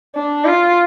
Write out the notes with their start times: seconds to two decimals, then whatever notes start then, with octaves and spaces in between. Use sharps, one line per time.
0.16 D4
0.45 F4